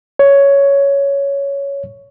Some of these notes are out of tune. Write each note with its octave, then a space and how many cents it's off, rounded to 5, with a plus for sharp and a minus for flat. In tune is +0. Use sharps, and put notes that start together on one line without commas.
C#5 +10